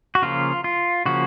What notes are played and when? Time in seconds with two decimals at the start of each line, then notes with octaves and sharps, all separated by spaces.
0.15 F#4
0.22 C#3 F3 A#3 C#4 F4
0.64 F4
1.06 C#3 F3 A#3 C#4 F#4